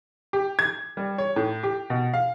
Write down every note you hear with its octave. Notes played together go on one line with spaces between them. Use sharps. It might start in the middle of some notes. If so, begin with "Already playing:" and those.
G4
G#6
G3
C#5
A2
G4
B2
F5